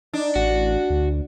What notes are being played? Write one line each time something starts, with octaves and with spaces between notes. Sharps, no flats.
D4 D#4
A1 F#4
D2